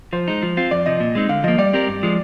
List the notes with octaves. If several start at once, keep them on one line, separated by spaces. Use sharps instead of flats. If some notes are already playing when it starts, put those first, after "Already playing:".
F3 C5
G#3 D#4
F3
C4 F4
F2 D5
C3 F3 D#5
A#2
G#3 C4 D#4
D3 F5
F3 A#3 D#5
G3 D5
C4 G4 A#4
G2
F3 G#3